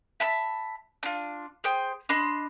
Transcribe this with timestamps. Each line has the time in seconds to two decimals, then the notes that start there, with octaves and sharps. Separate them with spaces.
0.20 E5 A5 B5
1.03 D4 F4
1.64 G#4 C5 G5
2.09 D4 D#5 B5 C6